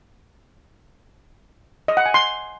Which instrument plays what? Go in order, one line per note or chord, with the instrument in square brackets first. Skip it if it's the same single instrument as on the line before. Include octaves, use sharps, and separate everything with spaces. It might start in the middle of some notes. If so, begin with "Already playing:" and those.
[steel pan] D#5
F#5
G#5
C6